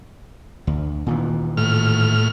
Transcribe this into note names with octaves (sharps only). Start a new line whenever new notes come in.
D2
A#2 D#3 E3
A2 F6